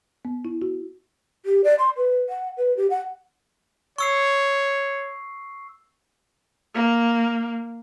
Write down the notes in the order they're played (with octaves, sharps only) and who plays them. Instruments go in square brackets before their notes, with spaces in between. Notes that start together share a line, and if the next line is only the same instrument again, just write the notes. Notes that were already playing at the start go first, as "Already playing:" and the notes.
[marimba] B3
E4
F#4
[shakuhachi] G4
D5
C6
B4
F#5
B4
G4
F#5
[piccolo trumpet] C#5 [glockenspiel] C#6 E6 C7
[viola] A#3